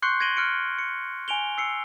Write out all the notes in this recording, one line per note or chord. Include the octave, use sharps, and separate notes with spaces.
C6 C#6 F#6 G6 C7 C#7
G#6 A#6 D7 D#7 F#7 G7
F6 F#6 C#7 D7
C#7
G#5 D7 F7 G7
E6 C7 C#7